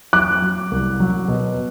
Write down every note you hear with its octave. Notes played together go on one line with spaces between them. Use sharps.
F#3 D6 F#6
F#3
C2
F#3
B2